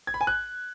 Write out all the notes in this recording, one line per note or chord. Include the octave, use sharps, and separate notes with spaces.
G#6
B5
G#5
F#6